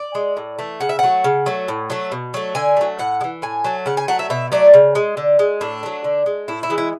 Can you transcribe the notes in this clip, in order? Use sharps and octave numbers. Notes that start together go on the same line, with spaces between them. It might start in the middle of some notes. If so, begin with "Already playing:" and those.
Already playing: D5
G#3
A2
E3 A3
C#3 F#5
E5
F#3 A3 F#5
C#3
F#3 A3
A2
F#3 A3
B2
F#3 A3
D3 G#5
F#3 A3
A2 F#5
G#3
E3
A2 G#5
F#3 A3
C#3 F#5
G#5
F#3 A3 F#5
E5
B2 E5
F#3 A3 D5
C#3
G#3
D3
G#3
A2 D4
F#3 A3
D3
G#3
A2 E4
E4
E3 G#3
E4